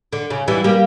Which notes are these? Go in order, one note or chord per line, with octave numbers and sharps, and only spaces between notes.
D3
C#3
E3 G3
G3 A#3